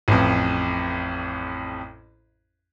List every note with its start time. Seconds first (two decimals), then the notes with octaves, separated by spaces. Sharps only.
0.08 A1 F2